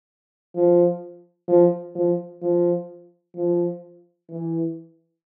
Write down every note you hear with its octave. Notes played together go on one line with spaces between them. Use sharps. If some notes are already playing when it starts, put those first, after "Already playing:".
F3
F3
F3
F3
F3
E3